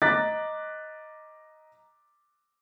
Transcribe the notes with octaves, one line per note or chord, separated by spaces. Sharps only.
D#5 A#5 D6 F#6 A6 B6